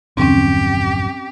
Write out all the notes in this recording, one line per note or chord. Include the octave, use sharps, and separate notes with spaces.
A#1 E2 G2 D3 F#3 C4 C#4 G4